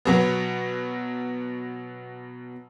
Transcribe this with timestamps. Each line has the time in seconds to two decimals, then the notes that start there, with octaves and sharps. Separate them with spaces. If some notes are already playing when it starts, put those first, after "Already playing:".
0.05 B2 F#3 B3